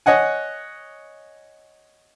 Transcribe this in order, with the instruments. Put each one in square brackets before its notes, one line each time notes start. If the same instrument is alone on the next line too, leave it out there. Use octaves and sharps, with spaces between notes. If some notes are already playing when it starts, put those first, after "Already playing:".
[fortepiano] C#5 D#5 F#5 G#5